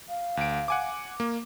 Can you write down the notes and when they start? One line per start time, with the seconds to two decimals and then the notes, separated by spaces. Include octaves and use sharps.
0.09 F5
0.37 D2 D7
0.68 F#5 G#5 D6
1.20 A#3